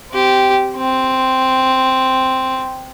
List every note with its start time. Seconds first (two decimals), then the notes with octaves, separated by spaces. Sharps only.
0.12 C4 G4
0.77 C4